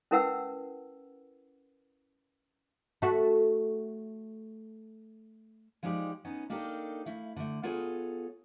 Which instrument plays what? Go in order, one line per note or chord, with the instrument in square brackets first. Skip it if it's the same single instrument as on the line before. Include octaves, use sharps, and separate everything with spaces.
[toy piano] C#4 E4 A#4 B4 F#5 E6
[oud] A3 F#4
[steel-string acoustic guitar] F3 G#3 D#4 G4 D5
B3 C#4 D#4
A#3 D4 D#4 G4 A4 A#4
A3 E4 F5
D3 A3
B3 F4 G#4 A4 C#5